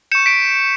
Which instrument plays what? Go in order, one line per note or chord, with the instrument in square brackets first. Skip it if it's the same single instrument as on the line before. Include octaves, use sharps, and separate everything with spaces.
[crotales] C#6 G6 C#7 E7
B6 D7